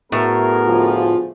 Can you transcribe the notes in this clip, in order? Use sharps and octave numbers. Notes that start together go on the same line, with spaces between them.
A2 B3 F#4 G#4 A#4
D2 F3 F4